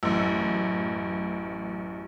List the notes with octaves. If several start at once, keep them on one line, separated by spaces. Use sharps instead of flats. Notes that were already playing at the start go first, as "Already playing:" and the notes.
A1 F#2